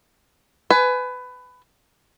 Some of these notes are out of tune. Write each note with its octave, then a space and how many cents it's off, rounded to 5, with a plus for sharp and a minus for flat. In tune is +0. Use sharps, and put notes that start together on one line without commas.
B4 +20 G#5 +20